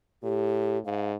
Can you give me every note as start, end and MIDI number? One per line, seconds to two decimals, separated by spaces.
0.23 0.79 45
0.23 0.78 67
0.85 1.15 44
0.85 1.09 77